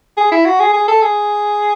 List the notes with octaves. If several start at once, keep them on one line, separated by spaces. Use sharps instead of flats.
G#4
E4
F#4
G#4
G#4
A4
G#4